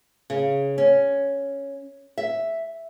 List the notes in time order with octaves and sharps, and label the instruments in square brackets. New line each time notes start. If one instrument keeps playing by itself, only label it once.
[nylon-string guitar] C#3
C#4
E5